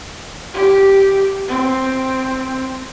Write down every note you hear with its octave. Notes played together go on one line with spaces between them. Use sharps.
G4
C4